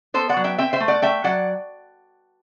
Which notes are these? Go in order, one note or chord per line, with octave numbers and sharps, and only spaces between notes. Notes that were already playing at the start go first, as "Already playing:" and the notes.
B3 A4 C5
D5 F#5
F#3
E5 G5
C4 E5 G5
C5 E5
A3
D5 F#5
A3 E5 G5
F#3 D5 F#5